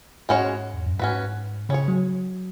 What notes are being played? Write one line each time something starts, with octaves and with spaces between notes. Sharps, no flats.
G#2 G#3 C#4 F#4 C#5
E2
F#2
G#2 C#4 F#4 B4
C#3 C#4 G#4 C#5
F#3